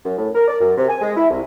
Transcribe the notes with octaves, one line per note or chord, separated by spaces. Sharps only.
F#2
A2
A#4
D5
F#2
C3
G#5
G#3
E4
C2